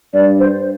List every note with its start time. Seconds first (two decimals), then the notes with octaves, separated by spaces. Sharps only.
0.14 G2 D5
0.39 C5